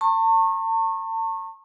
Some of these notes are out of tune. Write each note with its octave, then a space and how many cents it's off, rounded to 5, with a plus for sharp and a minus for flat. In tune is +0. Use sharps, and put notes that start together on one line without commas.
A5 +40 C#6 -30